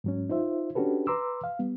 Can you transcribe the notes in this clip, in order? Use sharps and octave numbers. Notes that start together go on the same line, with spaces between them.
G#2 F#3 C#4
D#4 F4 C5 E5
C#4 D4 F#4 G4 A4 B4
B4 A#5 C6 D6 E6
F5
G3 B3